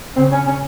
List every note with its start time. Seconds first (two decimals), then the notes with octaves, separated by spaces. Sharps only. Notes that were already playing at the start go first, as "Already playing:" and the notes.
0.15 C#3 C4
0.31 C#4
0.46 C#4